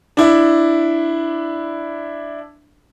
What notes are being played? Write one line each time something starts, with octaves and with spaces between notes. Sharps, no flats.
D4 E4